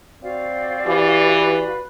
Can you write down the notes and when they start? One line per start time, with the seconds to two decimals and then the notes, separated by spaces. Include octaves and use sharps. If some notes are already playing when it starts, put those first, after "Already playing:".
0.22 C4 F#4 D5 F5
0.86 E3 G4
1.21 B4